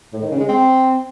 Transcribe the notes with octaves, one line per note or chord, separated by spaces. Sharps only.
A2
D#3
C#3
G#3
C4